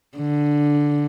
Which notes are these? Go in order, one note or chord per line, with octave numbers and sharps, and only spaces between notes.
D3